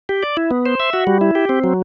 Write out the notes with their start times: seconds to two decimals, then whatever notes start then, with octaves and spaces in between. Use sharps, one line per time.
0.09 G4
0.23 D5
0.37 E4
0.51 B3
0.66 C5
0.80 E5
0.93 F#4
1.07 G3
1.21 E4
1.35 G4
1.49 C4
1.64 F#3